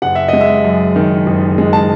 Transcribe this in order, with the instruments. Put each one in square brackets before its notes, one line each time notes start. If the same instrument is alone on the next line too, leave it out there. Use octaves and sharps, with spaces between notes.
[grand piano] F#1 F#5
E5
G#3 D#5
E5
F#2
D#3
F#1
G#3
A5